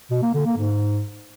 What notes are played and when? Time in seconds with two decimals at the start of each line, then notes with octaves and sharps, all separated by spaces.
0.10 B2
0.22 A#3
0.34 D3
0.46 A#3
0.57 G#2